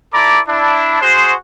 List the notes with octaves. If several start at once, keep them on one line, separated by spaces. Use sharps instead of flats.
E4 A4 D5 A#5 B5 D6
D4 E4
F#4 G#4 C5